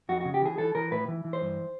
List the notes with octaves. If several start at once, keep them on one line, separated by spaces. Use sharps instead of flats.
F2 F#4
F#4
C#3
G4
E3 G#4
E3 A4
E3 A#4
A2 B4
E3
E3
C5
G2